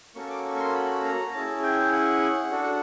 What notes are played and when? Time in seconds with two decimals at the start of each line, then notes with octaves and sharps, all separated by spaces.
0.15 A#3 C#4 F#4 A4 C#6
0.30 D6
0.44 C#6
0.56 C#6
0.60 C6
0.74 B5
1.04 A#5
1.33 C#4 E4 G#4 A5
1.63 G5
1.93 F#5
2.51 D4 F#4 A4